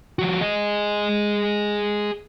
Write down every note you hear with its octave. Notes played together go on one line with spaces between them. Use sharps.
F3 F#4
G#4 D#5